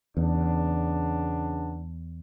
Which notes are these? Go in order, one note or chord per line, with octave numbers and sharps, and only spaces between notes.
E2 C#3 B3 D4